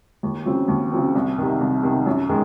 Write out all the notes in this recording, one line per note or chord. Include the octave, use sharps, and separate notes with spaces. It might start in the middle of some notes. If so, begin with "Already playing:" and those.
D#2
C#3 F#3 C4
D#2
C#3 F#3 C4
C2
C3 D#3
C2
C3 D#3
F#2
D#3 G#3